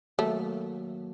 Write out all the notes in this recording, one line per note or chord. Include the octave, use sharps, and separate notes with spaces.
D#3 F#3 A3 A#3 F#4